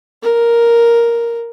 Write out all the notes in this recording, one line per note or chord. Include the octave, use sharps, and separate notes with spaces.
A#4